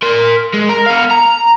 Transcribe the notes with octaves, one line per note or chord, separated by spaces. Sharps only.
A#4 C6
G#3
A#4
B3 F5
A#5